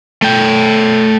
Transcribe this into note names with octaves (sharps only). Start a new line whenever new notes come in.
A3 G5